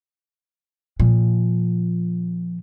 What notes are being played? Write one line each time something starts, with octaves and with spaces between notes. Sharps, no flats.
A#2 F3